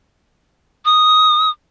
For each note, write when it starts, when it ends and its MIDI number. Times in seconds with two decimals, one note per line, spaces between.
0.85 1.49 87